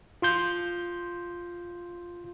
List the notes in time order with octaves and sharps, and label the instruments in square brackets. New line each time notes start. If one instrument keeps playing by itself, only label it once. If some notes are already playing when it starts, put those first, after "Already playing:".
[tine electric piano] F4 C6 G6